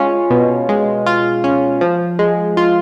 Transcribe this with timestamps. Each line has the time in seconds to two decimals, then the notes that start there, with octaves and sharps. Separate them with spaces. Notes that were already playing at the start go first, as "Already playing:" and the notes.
Already playing: G#3 C#4 F4
0.31 B2
0.69 G#3
1.06 F4
1.44 C#4
1.81 F3
2.19 G#3
2.57 F4